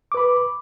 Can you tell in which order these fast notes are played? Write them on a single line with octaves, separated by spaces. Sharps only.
D6 B4 B5